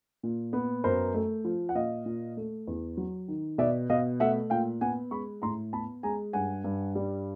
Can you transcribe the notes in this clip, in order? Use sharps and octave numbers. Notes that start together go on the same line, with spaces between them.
A#2
B3
F#2 A#4 C5
A3
F3
F#5
A#2 D#5 F5
A#2
A3
E2
F#3
D#3
B2 D5 E5
B2 D#5 F5
A3 E5 F#5
A#2 F5 G5
B3 F#5 G#5
G#3 B5 C#6
A2 A#5 C6
B3 A5 B5
G#3 G#5 A#5
G2 F#5 G#5
G2
G3